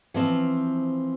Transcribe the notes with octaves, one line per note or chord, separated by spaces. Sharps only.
E3 F3 C4